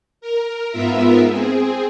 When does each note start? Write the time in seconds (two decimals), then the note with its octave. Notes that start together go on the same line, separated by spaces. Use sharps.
0.21 A#4
0.71 G#2 B3 F4 A#4 E5
1.30 C4 G#4